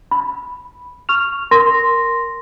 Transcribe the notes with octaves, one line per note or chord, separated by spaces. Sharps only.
B5
C#6 F6 F7
A#4 C6 A#6